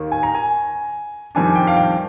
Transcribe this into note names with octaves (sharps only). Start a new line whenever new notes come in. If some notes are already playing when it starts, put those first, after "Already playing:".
Already playing: D#2 D#3 A#3
G#5
A#5
G#5
F2 D#3 G3 D4 G#5
G5
F5
G5